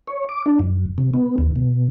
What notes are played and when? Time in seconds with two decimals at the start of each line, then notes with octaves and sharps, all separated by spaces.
0.08 C#5
0.29 D6
0.46 D4
0.59 F#2
0.98 C3
1.14 B3
1.38 D#2
1.56 B2